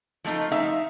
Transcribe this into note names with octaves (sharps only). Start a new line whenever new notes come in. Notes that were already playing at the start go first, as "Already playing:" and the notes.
F3 A3 D#4 F4
D#4 E5 F5